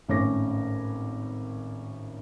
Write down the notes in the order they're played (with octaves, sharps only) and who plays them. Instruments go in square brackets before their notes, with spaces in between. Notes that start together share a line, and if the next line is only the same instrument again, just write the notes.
[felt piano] G#1 A2 C#4 C#5 D6 A#6